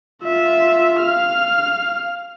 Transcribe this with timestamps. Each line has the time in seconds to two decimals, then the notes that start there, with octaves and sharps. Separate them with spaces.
0.24 F4 E5
1.00 F5 F6